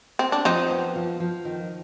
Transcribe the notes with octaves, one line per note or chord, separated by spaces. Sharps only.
C4
D4
F3 C4 D#4
B3
F3
F3
D#3